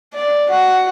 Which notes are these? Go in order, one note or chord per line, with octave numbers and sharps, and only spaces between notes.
D5
F#4